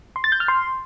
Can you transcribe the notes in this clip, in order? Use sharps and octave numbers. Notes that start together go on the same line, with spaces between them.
C6
A6
G6
F6
C6